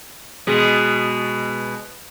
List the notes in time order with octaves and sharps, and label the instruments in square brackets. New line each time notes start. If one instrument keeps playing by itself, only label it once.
[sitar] B2 G#3